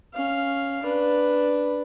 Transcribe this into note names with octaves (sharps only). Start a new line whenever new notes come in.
C#4 F5
D4 B4